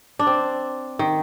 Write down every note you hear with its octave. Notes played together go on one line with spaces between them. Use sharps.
D4
C4
D#3